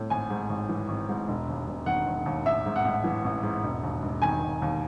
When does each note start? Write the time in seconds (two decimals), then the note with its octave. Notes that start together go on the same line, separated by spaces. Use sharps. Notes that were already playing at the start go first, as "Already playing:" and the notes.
Already playing: A2
0.10 G#1 G#5
0.30 G#2
0.49 G#1
0.69 E3
0.88 G#1
1.09 G#2
1.28 E1
1.48 D#2
1.67 E1
1.86 D#3 F#5
2.06 E1
2.26 D#2
2.45 A1 E5
2.66 G#2
2.76 F#5
2.85 A1
3.04 E3
3.25 A1
3.43 G#2
3.64 E1
3.83 D#2
4.03 E1
4.22 D#3 G#5
4.42 E1
4.62 D#2